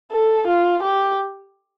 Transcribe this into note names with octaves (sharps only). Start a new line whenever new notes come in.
A4
F4
G4